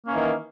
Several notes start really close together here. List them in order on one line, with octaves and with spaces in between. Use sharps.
A#3 C#4 E3 D#3